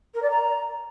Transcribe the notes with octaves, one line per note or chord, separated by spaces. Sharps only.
A#4
D5
A#5